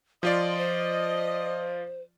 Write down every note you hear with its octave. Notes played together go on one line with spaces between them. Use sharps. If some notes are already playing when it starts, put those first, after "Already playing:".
F3 F4 D5 D#5 C6
C5